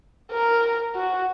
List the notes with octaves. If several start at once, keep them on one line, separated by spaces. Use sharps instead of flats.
A#4
F#4